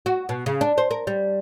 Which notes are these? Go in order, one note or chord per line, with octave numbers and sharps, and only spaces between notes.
F#4
B2
C#3
D4
C5
A#4
G3